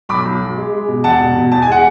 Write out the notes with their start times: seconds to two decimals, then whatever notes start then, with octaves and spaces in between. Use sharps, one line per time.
0.09 B1 B5 D6
0.25 B1
0.41 B1
0.57 G#3
0.73 G#3
0.88 B2
1.04 E1 F#5 A5
1.20 B2
1.36 B2
1.52 E2 A5
1.62 G#5
1.68 G#3 F#5